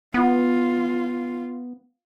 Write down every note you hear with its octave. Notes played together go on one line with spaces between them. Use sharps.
B3 F4